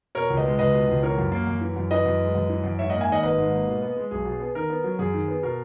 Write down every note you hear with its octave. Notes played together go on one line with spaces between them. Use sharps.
B2 A#4 C#5
C#2
B4 D#5
G#3
C#2 B4 D#5
B2
C#2
E3 A#4 C#5
F#2
A#3
F#2
E3
F#2
E3 B4 D#5
F#2
G#3
F#2
E3
F#2
G#2 C#5 E5
A#3 D#5 F#5
E5 G#5
D#3 D#5 F#5
G#1 B4 D#5
G#2
A#3
B2
B3
G#3
B1 G#4
B2
B3
D#3 A#4
B3
F#3
F#2 G#4
D#3
B3
B2 A#4